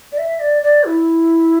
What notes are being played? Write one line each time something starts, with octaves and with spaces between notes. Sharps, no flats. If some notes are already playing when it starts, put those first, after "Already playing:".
D5
E5
D5
D5
E4